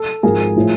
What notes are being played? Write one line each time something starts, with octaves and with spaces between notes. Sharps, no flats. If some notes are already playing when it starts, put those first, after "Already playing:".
Already playing: A4
G#1 G#2 F3 G#4 A#4
A2 F3